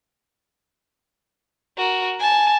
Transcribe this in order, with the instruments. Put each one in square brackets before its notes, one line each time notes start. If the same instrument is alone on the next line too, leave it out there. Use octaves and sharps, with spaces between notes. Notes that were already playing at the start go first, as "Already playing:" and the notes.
[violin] F#4 A#4
G#5 A5